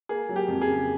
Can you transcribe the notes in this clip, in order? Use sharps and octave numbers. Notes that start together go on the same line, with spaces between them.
A#3 G#4
F#3
G4
F2
G#4
C#3